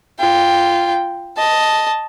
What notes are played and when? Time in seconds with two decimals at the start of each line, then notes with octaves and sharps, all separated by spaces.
0.19 F4 G5
1.36 D#5 A5